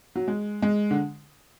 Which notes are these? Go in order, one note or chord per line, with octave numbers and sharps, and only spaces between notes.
F#3
G#3
G#3
D3